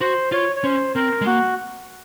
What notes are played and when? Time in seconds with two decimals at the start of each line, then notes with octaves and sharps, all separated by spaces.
0.01 F#4 C5
0.32 F4 C#5
0.56 C#5
0.64 C#4 C5
0.95 C4 A#4
1.21 G#3
1.26 A#3 F#4